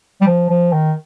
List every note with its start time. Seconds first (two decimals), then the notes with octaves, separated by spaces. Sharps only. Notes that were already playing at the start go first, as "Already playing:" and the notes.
0.21 G3
0.27 F3
0.50 F3
0.73 D#3